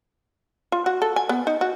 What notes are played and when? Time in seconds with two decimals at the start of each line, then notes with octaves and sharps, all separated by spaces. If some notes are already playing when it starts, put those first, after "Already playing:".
0.72 F4
0.86 F#4
1.02 A4
1.16 G#5
1.29 B3
1.47 D#4
1.61 F#4